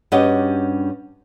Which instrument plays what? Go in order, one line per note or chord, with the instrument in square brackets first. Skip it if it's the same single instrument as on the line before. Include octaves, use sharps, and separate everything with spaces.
[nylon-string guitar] G2 C#4 F#4 G4 D#5